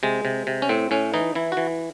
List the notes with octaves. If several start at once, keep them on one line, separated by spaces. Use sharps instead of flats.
C3 G#3
C3
C3
C#4
A2 C4
A2 C#4
E3 D#4
E3 E4
F#4
E3